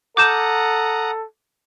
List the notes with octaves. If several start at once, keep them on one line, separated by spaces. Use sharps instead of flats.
A4 F#5 A#5 D6 D#6 G6 E7